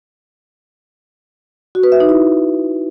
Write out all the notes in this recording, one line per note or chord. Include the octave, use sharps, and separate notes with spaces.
F#4
B4
E5
D#4
E4